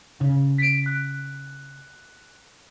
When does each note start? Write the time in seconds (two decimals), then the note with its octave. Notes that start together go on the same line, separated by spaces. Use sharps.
0.21 C#3
0.58 B6 D7
0.86 F#6